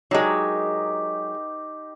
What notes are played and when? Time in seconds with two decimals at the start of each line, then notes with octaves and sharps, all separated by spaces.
0.11 F#3 G#3 D#4 G4 A#4